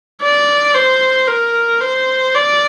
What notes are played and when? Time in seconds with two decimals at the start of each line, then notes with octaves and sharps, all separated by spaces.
0.22 D5
0.75 C5
1.28 A#4
1.81 C5
2.35 D5